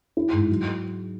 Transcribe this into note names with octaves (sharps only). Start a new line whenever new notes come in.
E4
G#2
F#3